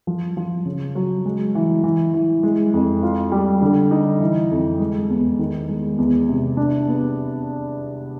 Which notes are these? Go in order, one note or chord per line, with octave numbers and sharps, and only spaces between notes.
F3
F3
C#3
F#3
G#3
E3
E3
E3
G#3
F2
F4
G3
D3
D#4
E3
F2
G#3
E2
D#3
G#3
E2
C3
D4
B3